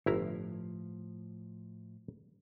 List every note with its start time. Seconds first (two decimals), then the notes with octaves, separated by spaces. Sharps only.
0.06 G1 A2 F3 E4 A#5